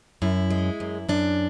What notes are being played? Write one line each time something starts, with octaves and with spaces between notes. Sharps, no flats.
F#2 E4
G#3
F#2
F#2 D4